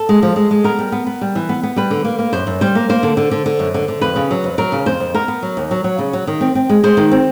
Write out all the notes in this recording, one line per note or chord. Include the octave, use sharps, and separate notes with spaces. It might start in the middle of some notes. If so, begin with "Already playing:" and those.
Already playing: A4
G#3
F3
G#3
G#3
B3 A#4
G3
B3
B3
G3
E3
B3
B3
G3 B4
D3
A#3
A#3
F#2 C5
F#2
G3 C5
A#3
A#3 C5
D3
D3
D3
D3
F#2
D3
D3
F2 B4
C#3
F#3
F2
F#3 A#4
C#3
F2 C5
F2
B3 A#4
B3
F#3
D#2
F#3
F#3
C#3
F#3
D#3
C4
C4
G#3
G#3 C5
D#3
C4